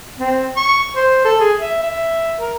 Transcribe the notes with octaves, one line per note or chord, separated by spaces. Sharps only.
C4
C#6
C5
A4
G#4
E5
E5
A#4